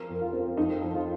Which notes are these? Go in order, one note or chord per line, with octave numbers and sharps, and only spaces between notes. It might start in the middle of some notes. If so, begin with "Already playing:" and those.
Already playing: F3 C4 A#4
F2
F4
C4
F2 D#4
F2
F4